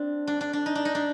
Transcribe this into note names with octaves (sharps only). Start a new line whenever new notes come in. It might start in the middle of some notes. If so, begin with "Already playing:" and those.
Already playing: C4 D4
D4
D4
D4
D#4
D4
D#4
D4